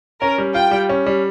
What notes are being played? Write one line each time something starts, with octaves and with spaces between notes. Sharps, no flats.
C#4 A#4
G3
F4 G5
G3
C#4
G3